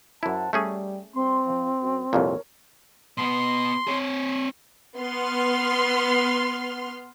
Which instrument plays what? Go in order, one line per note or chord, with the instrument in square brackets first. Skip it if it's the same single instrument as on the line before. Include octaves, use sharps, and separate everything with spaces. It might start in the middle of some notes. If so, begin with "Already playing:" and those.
[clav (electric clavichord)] F#2 E4 [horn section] C5 F#5 A5
[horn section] G3 [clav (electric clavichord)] A3 C#4 G#4
[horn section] G2 C6 [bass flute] C4
[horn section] F3
F#2
[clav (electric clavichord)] C2 F2 A#2 [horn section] A#4 C#5
[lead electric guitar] B2 B3 [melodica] C6
[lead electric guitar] C4 C#5
[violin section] B3 C6 F6